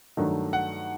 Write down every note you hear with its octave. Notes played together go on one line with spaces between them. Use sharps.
G2 D#3 F#3 A3
F#5